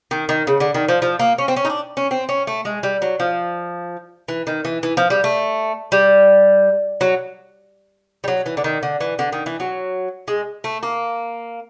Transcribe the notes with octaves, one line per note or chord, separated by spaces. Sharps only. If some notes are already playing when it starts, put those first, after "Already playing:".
D#3
D#3
C#3
D3
D#3
F3
F3
A#3
C#4
C4
C#4
D#4
D4
C#4
C4
C#4
A3
G#3
G3
F#3
F3
E3
D#3
E3
E3
F3
G3
A3
G3
F#3
G3
F#3
E3
D3
D#3
D3
E3
D3
D#3
E3
F#3
G#3
A3
A#3